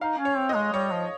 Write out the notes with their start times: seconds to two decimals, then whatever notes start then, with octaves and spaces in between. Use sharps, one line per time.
0.01 D#4 F5
0.18 C#4
0.25 C#5
0.37 C4
0.49 D#5
0.55 G#3
0.73 G3 C#5
0.92 F3